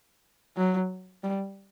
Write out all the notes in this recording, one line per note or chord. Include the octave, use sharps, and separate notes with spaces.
F#3
G3